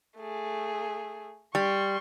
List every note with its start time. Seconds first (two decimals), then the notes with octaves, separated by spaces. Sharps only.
0.17 A3 G#4
1.55 G3 C6 C#6